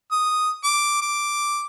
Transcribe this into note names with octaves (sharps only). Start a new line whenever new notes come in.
D#6
D6
D6